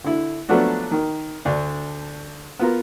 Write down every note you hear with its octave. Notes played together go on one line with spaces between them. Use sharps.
D3 E4
F3 F#3 A3 B3 D4 F#4
D#3
D2 D4
B3 F4 A#4